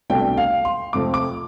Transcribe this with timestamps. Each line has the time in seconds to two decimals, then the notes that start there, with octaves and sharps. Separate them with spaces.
0.10 C2 B2 A3 D4 G5
0.38 F5
0.65 C6
0.93 F2 C3 F3 A3 C4 D6
1.14 D6